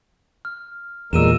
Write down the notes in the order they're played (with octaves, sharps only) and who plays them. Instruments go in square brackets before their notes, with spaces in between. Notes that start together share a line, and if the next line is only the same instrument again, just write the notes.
[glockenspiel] F6
[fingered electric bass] E2 A#2 [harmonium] G3 G#3 A#4 [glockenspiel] E6 D#7 E7